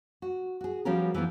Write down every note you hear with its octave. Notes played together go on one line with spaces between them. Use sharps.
F#4
F#4 G#4
F3 G3 B3 C#4 F#4 A#4
E3 F3 G3 B3